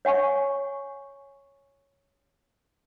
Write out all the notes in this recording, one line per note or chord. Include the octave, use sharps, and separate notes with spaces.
C#5 F#5 G#5 C#6